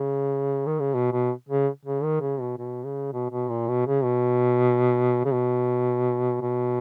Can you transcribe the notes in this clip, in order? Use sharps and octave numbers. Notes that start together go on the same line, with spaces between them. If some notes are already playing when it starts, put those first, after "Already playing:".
Already playing: C#3
D#3
C#3
B2
B2
C#3
C#3
D#3
C#3
B2
B2
C#3
B2
B2
A#2
B2
C#3
B2
C#3
B2
B2